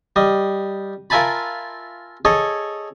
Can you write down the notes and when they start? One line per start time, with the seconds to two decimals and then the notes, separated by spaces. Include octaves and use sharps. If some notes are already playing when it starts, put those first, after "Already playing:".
0.16 G3 D#5
1.10 F4 A#4 E5 G#5 A5 B5
2.25 G#4 A4 C#5 D#5